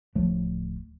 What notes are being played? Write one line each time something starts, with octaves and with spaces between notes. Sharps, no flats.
D1 F3 F#3 A3